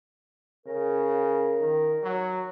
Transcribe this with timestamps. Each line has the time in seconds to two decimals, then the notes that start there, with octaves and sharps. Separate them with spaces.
0.66 C#3 A#4
1.60 D#3
2.03 F#3